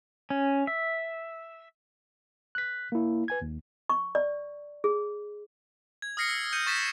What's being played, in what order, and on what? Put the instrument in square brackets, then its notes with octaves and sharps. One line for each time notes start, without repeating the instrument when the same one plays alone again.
[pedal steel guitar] C#4
E5
[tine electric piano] F#6 B6
A#3 E4
B4 G#5 G#6
D#2
[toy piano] C#6
D5
G#4
[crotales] G#6
D#6 F6 A#6 C7 C#7
E6 C#7
G6 C#7 D#7
C#6 A6 B6 E7